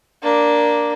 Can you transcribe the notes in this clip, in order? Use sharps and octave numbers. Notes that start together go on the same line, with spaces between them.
A#3 D4